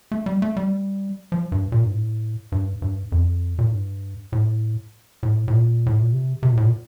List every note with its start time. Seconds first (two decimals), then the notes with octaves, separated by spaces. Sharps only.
0.12 A3
0.26 G3
0.42 A3
0.57 G3
1.32 F3
1.52 G2
1.72 A#2
1.84 G2
1.92 A2
2.52 G2
2.82 G2
3.12 F2
3.59 A#2
3.65 A2
3.72 G2
4.32 A2
5.23 A2
5.48 A2
5.52 A#2
5.86 A2
6.00 A#2
6.12 C3
6.43 C3
6.50 A#2
6.57 A2
6.65 A#2